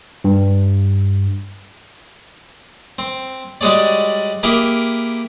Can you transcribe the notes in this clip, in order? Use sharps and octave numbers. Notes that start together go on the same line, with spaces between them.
G2
C4
G3 G#3 F#4 G#4 C#5 D5
A#3 E4 G4 G#4 A#4